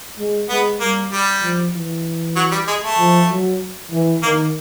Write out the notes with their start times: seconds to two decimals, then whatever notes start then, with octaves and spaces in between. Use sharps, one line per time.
0.19 G#3
0.49 G#3 B3
0.80 G3 A#3
1.11 G3
1.43 F3
1.74 E3
2.36 F#3
2.52 G3
2.67 G#3
2.83 A3
2.98 F3
3.30 F#3
3.91 E3
4.22 D#3 A#3